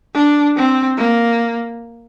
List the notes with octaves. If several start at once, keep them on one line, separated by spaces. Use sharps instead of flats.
D4
C4
A#3